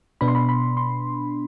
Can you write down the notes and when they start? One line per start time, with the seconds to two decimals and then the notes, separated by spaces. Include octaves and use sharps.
0.21 B2 B3 D4 B5
0.28 C6
0.35 B5
0.49 B5
0.77 C6